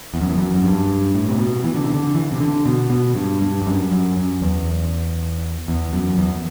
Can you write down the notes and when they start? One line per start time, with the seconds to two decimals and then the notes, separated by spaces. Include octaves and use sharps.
0.14 E2
0.21 F#2
0.30 E2
0.38 F#2
0.54 F#2
0.64 G2
1.15 A2
1.29 C3
1.39 B2
1.64 E3
1.75 D3
1.84 C3
1.94 D3
2.15 E3
2.32 C3
2.40 D3
2.66 B2
2.90 B2
3.16 G2
3.41 G2
3.62 G2
3.66 F#2
3.91 F#2
4.17 F#2
4.41 E2
5.68 E2
5.93 F#2
6.18 E2